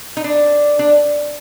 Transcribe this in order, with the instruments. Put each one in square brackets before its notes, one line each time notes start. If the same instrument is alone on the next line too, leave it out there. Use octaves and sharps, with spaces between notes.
[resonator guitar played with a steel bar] D#4
D4
D4